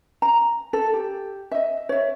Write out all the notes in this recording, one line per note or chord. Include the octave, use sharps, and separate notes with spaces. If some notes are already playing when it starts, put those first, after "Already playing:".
A#5
A4
G4
D#5 E5
C#5 E5